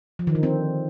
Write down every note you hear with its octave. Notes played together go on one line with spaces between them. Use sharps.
F3
D#3
D3
C4